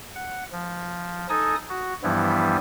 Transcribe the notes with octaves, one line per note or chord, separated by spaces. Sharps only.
F#5
F3
D#4 A4 G#5 D#6
F#4
G2 E3 F3 G3 B3 E4